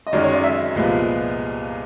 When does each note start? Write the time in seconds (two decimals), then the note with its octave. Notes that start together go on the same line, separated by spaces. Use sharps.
0.07 D#5
0.13 F#2 D#3 G#3 C#4 F#4 D5
0.24 C#5
0.33 D5
0.43 E5
0.76 C2 A#2 F3 G#3 B3